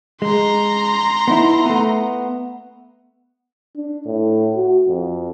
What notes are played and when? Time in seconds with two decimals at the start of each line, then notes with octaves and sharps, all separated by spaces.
0.22 G#3 A#5 C6
1.28 B3 D#4 E4
1.65 A3 B3
3.76 D4
4.06 A2
4.55 F#4
4.88 F2